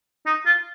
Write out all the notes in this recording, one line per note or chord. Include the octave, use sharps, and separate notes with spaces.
D#4
F4